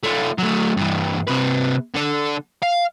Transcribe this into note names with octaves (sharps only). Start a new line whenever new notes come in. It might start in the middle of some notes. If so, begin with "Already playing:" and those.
A3 F4
F#3 A3
G2 E3
C3 B4
D3 A4
F5